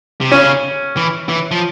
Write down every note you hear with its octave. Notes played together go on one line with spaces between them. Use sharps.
C3
C#3 C#4
E3
E3
F3